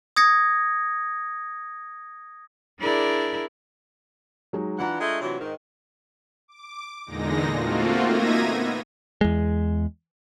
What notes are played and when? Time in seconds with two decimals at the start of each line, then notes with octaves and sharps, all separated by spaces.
0.16 D#6 G#6 A#6 C#7
2.79 D4 E4 G#4 A#4 D5
4.53 F#3 G#3 D#4
4.79 E3 D4 F4 F#5 A#5
5.00 G#3 A3
5.21 C3 E3 F#3
5.40 G#2 D#3
6.48 D6
7.06 E2 A#2 D3 G#3 D#4 A#6
7.54 A3 A#3 C4 F4 F#4
8.05 A#3 D#4 E5 G#6 A#6 D#7
8.42 B3
9.21 E2 G#3